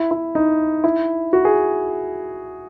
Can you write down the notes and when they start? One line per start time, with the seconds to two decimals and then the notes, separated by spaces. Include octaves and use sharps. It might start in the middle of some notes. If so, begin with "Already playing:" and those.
Already playing: E4
0.11 E4
0.35 D#4
0.84 E4
1.33 F#4
1.45 G#4